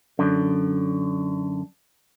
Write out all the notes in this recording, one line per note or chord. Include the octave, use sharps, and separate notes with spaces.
F#2 D3